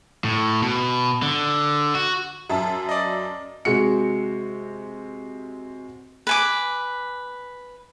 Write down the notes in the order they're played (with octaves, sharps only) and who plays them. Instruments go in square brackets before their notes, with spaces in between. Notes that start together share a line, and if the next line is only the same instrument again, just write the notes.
[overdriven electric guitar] A2
B2
D3
F#4
[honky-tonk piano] F#2 E5 A5
[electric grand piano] D5 D#5
[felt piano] C3 G#3 F#4 C#7
[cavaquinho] B4 G#5 D6